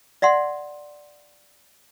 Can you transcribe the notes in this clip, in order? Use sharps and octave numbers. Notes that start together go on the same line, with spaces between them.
D5 E5 F#5 C6